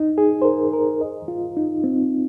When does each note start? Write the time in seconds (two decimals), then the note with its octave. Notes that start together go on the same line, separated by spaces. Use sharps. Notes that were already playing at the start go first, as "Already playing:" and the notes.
Already playing: D#4
0.18 G#4
0.42 C5
0.45 A#4
0.73 A#4
1.01 D#5
1.28 F4
1.57 D#4
1.84 C4